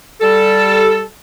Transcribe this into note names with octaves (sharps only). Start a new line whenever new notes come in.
G3 A4